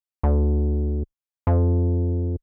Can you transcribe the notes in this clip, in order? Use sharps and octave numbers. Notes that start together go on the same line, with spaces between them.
D2
F2